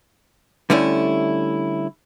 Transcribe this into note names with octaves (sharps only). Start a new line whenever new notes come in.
D3 G3 A3 C#4 E4